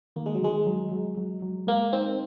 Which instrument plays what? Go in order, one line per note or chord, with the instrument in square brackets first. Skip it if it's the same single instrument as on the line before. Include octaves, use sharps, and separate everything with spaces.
[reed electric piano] D#3 [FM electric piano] A#3
[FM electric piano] G#3
F#3
[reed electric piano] D#3 [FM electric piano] G#3
[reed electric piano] F#3
F#3
F#3
F#3
[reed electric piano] G#3 [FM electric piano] A#3
[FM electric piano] C4 [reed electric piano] D#4